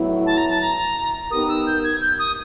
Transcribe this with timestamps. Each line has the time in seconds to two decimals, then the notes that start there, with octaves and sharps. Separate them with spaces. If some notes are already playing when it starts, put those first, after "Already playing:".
Already playing: A2 F#3 B3 E4
0.26 A5
0.37 A#5
0.49 A5
0.61 A#5
1.31 B3 D#4 G4 A#4 D#6
1.48 E6
1.66 G6
1.83 G#6
2.01 G6
2.19 D#6